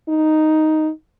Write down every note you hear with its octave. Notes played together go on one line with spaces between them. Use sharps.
D#4